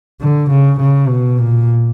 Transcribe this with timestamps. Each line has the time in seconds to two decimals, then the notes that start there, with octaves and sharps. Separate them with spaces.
0.21 D3
0.50 C#3
0.80 C#3
1.08 B2
1.38 A#2